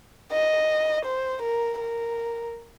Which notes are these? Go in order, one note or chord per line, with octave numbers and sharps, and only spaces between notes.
D#5
C5
A#4
A#4